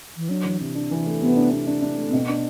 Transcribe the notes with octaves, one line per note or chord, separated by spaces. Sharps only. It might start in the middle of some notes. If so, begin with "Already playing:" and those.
E3
F#3 D4
E3
C3
D4
E3
A3
C3 B3
D4
D4
D4
D4
A3
B3
B2 C4
D4